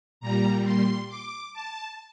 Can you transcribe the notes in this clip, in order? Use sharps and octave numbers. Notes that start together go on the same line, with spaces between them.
A#2 G3 A#5
C6
D6
A5